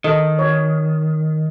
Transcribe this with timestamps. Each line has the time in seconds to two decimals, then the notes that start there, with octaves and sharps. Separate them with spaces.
0.04 D#3 A4 D#5
0.39 C#5